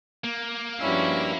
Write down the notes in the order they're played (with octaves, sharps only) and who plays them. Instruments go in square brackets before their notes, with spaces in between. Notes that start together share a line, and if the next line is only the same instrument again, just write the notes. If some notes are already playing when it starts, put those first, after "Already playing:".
[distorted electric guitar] A#3
[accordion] G2 G3 E6 [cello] F3 C#4 [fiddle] E4 F#4